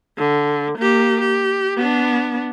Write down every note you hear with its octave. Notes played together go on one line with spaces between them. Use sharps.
D3
A#3 G4
G4
B3 D4